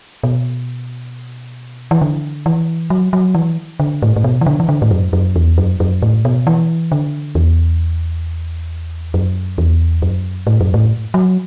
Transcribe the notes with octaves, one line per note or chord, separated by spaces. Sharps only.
B2
E3
D3
E3
F#3
F#3
E3
D3
A2
A2
B2
E3
D3
E3
D3
A2
F#2
F#2
E2
F#2
F#2
A2
B2
E3
D3
E2
F#2
E2
F#2
A2
F#2
A2
F#3